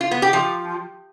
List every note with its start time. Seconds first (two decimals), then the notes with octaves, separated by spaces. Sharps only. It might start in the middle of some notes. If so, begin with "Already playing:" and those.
0.01 F4
0.11 B3
0.22 G4
0.33 F3